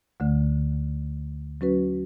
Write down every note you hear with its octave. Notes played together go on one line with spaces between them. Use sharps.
D2 D3 A3
F#3 C#4 F#4 B4